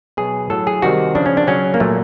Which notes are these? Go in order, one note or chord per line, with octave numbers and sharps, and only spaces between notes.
B2 F#3 G#4
A2 F#3 A4
G#4
C3 D#3 G3 F#4
C#3 F3 D4
C#4
D4
C#3 F#3 C#4
A#3
A#2 F#3 A3